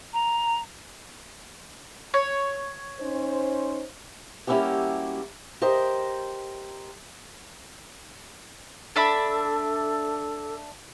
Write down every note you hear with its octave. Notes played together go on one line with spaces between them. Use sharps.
A#5
C#5
C#4 D#4 C5
G3 A#3 C#4 E4 F#4 G4
G4 A#4 C5 D#5
D4 A4 E5 B5